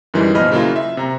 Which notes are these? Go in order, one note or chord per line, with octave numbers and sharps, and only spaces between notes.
F#2 D#3 E3 G3 G#3
A#1 B2 F3 D#5 B5 F6
C#3 F#3 A#3 E4 F4
E5
C3 A#5